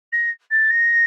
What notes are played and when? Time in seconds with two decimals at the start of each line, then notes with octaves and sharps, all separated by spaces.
0.12 A#6
0.50 A6
0.70 A#6